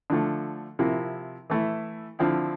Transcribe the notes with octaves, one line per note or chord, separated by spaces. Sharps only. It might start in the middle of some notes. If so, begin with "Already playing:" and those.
D3 F3 A3
C3 F3 A#3 E4
E3 A3 E4
D3 F3 C4 E4